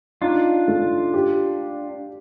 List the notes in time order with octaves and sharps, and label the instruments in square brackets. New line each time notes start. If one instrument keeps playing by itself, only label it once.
[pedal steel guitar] D4 F4 [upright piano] D#4
[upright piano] A3
G4